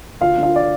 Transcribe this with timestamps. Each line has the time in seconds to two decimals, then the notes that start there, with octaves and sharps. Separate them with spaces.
0.21 D2 F4 F5
0.37 D3
0.43 F4 F5
0.56 D5